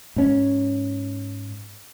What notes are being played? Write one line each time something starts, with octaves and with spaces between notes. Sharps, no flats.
G#2 C#4